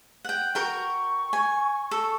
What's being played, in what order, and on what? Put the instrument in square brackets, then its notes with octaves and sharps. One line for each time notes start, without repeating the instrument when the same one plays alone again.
[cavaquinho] F#5 G5
[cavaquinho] F#4 A#4 G5 [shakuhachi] C#6
[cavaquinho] G#5
A4